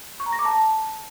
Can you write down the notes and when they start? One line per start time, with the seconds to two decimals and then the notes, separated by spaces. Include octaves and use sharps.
0.20 C#6
0.26 A#5
0.33 A#6
0.39 D6
0.45 A5